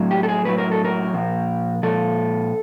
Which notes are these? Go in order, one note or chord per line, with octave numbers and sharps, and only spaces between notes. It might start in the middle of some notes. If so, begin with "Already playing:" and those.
Already playing: A2 F#3
G4
A4
G#4
A2 F#3 B4
A#4
A4
A#4
A#2 F3
A#2 F3 A4